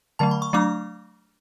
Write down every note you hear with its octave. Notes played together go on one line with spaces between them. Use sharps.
D3 F#3 A3 A5
B5
C#6
F#3 A3 D4 D6